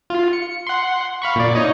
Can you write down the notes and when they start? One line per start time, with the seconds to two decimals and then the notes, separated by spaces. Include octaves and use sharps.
0.10 F4
0.33 C#7
0.67 F#5 C6
1.22 F5 B5 C#6
1.35 A#2 D5
1.55 D#4 C#5 D#5